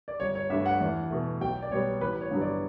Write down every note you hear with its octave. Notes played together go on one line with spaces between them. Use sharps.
D5
G1 C#5
C#5
G2 D3 A3 E5
F#5
E2
B2 A3
B1 G5
D5
B2 G3 B3 C#5
A1 B4
C#5
G2 D3 F#3 B3
D5